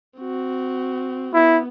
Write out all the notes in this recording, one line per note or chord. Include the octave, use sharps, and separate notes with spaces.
C4 F#4
B3 E4